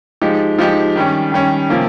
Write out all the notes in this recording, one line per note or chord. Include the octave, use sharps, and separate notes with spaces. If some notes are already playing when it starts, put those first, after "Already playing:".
F3 G#3 D#4 G4
F3 G#3 D#4 G4
D#3 G3 C#4
D#3 G3 C#4
C3 F3 A#3 C#4